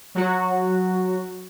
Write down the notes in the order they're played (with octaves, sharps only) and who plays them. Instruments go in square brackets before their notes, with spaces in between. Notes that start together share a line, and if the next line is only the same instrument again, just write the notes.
[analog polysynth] F#3 F#4